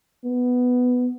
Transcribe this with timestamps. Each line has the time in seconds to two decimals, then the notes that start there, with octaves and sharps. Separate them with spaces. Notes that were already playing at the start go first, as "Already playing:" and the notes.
0.25 B3